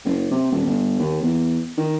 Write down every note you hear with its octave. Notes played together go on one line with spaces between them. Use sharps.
F#1
C3
D#1
G1
D#2
E2
D#3